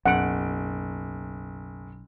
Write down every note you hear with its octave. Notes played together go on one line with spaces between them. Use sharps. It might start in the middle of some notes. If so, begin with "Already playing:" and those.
F#1 B1 F#5 D7